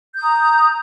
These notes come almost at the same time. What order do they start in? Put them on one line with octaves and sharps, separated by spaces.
G6 D#6 A#5